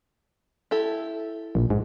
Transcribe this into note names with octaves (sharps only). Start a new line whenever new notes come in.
E4 G4 A4
A#1
G#2